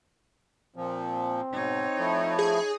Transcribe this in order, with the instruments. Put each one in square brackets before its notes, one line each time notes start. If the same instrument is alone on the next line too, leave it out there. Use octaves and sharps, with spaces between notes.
[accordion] A#2 F3 [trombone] C4
[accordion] G#2 B2 [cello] D#4 C#5
[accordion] F3 A3 E4
[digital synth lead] G#4